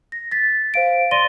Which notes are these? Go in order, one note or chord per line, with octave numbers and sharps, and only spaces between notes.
A#6
A6 B6
C5 F5 D7
D5 C6 A6 A#6 D#7 G7